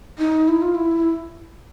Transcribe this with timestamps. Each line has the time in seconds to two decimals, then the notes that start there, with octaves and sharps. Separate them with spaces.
0.19 D#4
0.48 E4
0.62 F4
0.75 E4